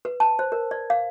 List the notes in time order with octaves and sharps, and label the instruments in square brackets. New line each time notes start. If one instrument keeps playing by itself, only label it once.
[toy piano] B4
A5
C5
A#4
D5
F5